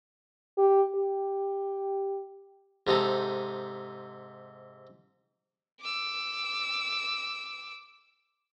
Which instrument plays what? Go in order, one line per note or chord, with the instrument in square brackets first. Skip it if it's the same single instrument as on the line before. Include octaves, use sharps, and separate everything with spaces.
[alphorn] G4
G4
[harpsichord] G#2 C3 D#4 A4
[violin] D6 E6